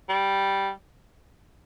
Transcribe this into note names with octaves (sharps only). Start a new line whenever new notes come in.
G3